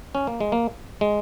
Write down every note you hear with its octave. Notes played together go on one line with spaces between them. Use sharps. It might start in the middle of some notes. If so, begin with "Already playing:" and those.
C#4
A#3
G#3
A#3
G#3